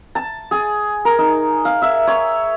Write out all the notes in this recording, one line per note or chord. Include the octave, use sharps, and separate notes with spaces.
A5
G#4
A#4
D#4
F5
E5
C#5